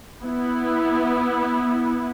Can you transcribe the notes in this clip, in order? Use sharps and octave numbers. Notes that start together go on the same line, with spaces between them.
B3 E4